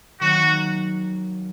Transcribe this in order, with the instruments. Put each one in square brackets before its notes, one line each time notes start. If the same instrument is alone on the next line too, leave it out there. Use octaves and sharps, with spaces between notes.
[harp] D#3 F#3 A#3 [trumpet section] F#4